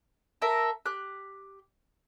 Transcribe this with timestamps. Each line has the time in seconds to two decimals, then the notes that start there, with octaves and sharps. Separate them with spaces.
0.42 A4 A#4 E5
0.86 G4 F#6